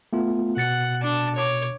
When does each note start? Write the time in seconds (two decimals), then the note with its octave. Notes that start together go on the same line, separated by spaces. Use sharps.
0.13 A3 B3 F4
0.57 B2 F#5 A6 C#7
1.02 D4 A5
1.36 C#5 D6